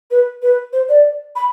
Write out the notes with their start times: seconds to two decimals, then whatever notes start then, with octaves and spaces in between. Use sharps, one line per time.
0.11 B4
0.42 B4
0.73 C5
0.89 D5
1.36 B5